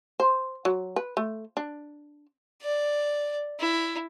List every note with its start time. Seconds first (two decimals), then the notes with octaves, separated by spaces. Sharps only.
0.20 C5
0.65 F#3
0.96 B4
1.17 A3
1.57 D4
2.62 D5
3.60 E4